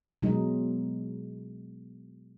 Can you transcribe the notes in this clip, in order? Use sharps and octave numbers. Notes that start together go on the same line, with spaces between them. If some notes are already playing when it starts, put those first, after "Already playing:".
B2 F#3 G#3 D#4